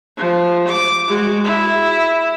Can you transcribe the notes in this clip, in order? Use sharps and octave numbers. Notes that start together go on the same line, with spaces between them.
F3
D6
G#3 F#4
E4